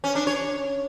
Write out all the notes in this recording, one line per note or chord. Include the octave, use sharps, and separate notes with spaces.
C#4
D4
C#5